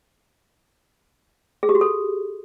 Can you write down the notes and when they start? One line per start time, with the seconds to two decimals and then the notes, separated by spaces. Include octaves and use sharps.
1.63 G#4
1.69 G4
1.75 F#4
1.81 A4